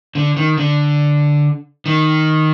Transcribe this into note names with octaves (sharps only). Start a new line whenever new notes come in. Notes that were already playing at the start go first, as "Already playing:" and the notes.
D3
D#3
D3
D#3